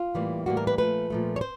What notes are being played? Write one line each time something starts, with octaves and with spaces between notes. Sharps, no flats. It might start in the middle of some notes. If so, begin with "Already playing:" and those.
Already playing: F4
A2 E3 G3 A#3
A2 E3 G3 A#3 F#4
A#4
B4
A#2 F3 A3 B4
A#2 F3 A3
C#5
C5